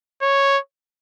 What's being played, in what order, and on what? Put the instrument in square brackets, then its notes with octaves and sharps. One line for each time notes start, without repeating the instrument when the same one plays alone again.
[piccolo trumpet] C#5